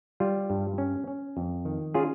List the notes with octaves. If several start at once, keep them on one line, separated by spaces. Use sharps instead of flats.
G3 F4
G2
C#4
C#4
F2
D#3
C#4 F4 G#4